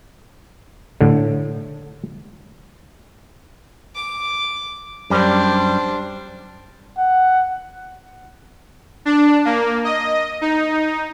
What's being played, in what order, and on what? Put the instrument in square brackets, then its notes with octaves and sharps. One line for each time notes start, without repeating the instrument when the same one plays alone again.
[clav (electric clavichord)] A2 D3
[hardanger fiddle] D6
[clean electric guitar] F#2 G3 [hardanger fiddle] D4 C5
[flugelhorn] F#5
[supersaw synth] D4
A#3
D#5
D#4